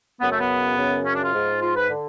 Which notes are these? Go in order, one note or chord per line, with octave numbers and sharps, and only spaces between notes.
F#2 C#3 B3
A3
B3
F#2 C#3
C#4
D4
F4
G#2
F4
B4
D3